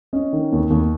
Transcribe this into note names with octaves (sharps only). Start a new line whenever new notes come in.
C#4 D#5
D#3
D#2
D#2